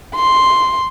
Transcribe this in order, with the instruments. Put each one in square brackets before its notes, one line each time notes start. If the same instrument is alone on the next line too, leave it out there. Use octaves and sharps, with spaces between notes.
[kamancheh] C6